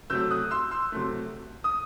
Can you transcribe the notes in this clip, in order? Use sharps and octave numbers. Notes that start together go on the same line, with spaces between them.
C3 F#3 A3 E6 G6
D#6 F#6
C6 E6
C6 E6
C3 F#3 A3
D#6